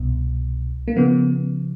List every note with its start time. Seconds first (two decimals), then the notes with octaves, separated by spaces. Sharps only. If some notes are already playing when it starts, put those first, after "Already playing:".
Already playing: C2 B2
0.88 A#3
0.96 C#3 F3 B3